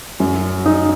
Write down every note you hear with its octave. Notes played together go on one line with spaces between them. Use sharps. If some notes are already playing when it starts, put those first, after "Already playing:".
F#2
D#4